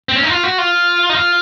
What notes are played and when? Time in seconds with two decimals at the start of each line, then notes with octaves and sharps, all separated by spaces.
0.09 C4
0.16 C#4
0.23 D#4
0.30 F4
0.43 F#4
0.58 F4
1.09 D#4
1.15 F4